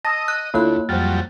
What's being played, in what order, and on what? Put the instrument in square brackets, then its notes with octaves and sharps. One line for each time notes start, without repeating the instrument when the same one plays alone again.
[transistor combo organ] D#5 [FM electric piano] A5 D#6 E6 [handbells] A#6
[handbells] F#6
[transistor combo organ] D2 [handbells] A#3 F#6 [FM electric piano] E4 F4 A4 [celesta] C#5
[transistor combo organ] F2 F#3 G3 [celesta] C5 F6 [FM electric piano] A6